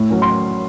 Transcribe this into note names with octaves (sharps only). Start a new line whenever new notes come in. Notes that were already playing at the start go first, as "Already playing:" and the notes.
Already playing: A2
F#3 C#4
C6